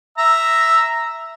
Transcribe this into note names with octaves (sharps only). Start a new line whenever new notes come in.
E5 A#5 E6